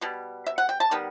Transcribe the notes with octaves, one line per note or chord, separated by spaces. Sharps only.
B2 G3
E5
F#5
G5
A5
D#3 G3 B3